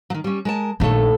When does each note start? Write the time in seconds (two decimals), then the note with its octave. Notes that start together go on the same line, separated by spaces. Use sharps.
0.10 D#3 F#3
0.24 G3 C#4
0.45 G#3 A#4 A5
0.80 A#1 D#2 D#3 A3 A4